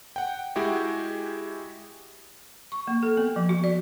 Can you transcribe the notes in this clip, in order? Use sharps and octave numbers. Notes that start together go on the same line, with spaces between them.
F#5 G5
G#3 E4 F#4 G4
C#6
A#3
A4
B3
F3
F#4
D5